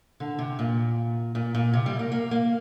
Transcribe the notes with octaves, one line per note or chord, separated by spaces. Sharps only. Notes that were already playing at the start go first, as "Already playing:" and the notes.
D3
C3
A#2
A#2
A#2
C3
G3
A#3
A#3
A#3